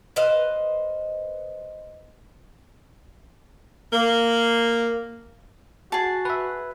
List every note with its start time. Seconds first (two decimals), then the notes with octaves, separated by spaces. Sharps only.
0.16 B4 C5 D#5 F5
3.90 A#3
5.92 F#4 G#4 A5
6.25 B4 E5